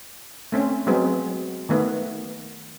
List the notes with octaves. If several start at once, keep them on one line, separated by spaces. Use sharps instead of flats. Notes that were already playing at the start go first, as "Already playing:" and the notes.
A3 C4 C#4
F#3 G#3 B3 C4
D#3 A3 B3